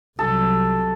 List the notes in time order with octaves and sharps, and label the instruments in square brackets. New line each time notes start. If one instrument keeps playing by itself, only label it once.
[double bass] C2 F#3 [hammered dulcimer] A4